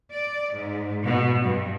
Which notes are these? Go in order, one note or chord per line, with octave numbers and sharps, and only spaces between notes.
D5
G#2
B2
G2